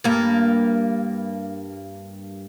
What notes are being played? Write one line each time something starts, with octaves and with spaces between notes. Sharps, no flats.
G2 A#3